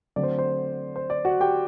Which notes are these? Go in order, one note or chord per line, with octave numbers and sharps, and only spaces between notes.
D3 F#3 A3 C4 D5
C5
C5
C5
D5
F#4 F#5
G4 G5